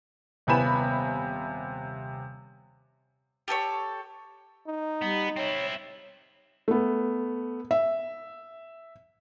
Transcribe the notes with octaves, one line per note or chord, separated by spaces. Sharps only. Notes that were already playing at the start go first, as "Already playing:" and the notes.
D#1 C3 B3 G#5 B5 E7
G4 A4 B4 C#5
D#4
G3 B3
C4 E4 C#5
A3 B3
E5